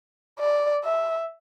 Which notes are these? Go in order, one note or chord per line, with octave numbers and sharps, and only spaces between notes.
D5
E5